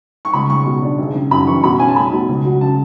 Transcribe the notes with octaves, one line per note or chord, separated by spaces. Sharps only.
C#6
C#2 B5
G#3 C#6
B2
D4
G#1
C#3
F#2 B5
E3 C#6
B2 B5
C#4 G#5
A5
A3 B5
B2
C#2
F#3
C#3 A5